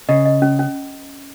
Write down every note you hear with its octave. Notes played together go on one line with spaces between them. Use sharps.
C#3 D#5
D#5
C#4
C#4